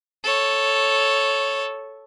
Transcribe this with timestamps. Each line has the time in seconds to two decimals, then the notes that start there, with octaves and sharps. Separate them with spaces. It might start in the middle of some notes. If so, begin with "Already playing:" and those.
0.24 A4 C#5